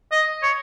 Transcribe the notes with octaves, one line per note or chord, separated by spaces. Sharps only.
D#5
C#5